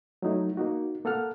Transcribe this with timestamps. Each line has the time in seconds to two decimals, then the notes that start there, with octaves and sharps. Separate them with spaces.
0.22 F#3 A3 D#4 E4
0.57 A#3 D#4 F#4
1.05 A#3 A4 F#5 F6